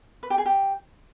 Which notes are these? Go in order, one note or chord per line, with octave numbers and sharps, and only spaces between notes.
B4
G4
G#4
G4